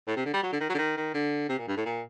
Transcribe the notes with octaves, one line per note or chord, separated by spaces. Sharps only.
A2
C3
D3
G3
F#3
D3
D#3
F#3
D3
D#3
D#3
D3
C3
A#2
G2
A2
A#2